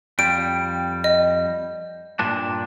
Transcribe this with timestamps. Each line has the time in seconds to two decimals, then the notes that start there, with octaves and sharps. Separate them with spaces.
0.19 F2 G3 D7
1.04 D#5
2.19 G2 A#2 D4